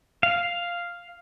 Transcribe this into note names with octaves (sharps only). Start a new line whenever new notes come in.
F5